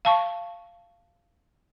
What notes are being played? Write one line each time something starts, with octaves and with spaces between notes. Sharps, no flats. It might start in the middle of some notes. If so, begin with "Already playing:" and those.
F5 A5 C#6